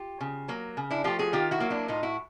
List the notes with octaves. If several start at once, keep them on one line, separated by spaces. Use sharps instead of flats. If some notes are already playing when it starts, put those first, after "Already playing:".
Already playing: F4 G4
C#3
F#3 A#3
C#3
D4 E4
F3 A3 F4 G4
F#4 G#4
D#3 F4 G4
E4 F#4
F#3 A#3
D4 E4
A2 D#4 F4
E4 F#4